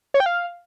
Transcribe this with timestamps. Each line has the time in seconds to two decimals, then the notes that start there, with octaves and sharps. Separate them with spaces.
0.14 C#5
0.20 G5
0.26 F5